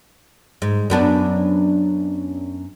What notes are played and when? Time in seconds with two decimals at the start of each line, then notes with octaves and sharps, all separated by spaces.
0.62 G#2
0.90 F#2 B3 D4